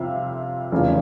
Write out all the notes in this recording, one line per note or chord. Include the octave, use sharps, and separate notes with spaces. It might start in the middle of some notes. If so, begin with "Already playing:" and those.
Already playing: F2 C3 E5 F5
F1 E2 C#3 F3